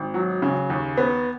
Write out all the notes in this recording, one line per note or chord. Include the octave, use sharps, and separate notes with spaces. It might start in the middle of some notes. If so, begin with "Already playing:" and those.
Already playing: G#1
F#3
C#3
D#2
B3